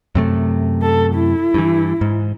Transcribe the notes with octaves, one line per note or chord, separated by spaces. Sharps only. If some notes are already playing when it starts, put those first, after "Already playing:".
F#2 C3 A3
A4
E4
G2 E3
G#2